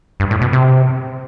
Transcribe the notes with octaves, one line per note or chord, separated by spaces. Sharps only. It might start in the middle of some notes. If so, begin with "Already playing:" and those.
G2
A2
B2
C3